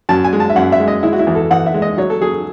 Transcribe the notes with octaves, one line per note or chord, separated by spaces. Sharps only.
F#2 A5
G#5
G#3
A5
E5
F#2 F#5
E5
G#3
D#5
G#3 E4
F#4
E4
E2
A4
E2 F#5
E5
G#3
D#5
F#3 C#5
A4
F#3 G#4